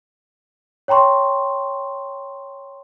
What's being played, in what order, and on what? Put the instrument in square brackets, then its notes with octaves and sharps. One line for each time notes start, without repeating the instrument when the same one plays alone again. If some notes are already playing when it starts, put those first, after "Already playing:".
[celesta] C#5 G5 A#5 C6 C#6